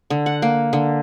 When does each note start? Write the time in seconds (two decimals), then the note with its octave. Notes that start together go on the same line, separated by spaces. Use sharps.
0.10 D3
0.26 F#5
0.42 A#3
0.73 D3